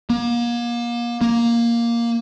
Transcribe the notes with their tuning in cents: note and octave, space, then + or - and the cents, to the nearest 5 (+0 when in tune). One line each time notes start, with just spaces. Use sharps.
A#3 +35
A#3 +5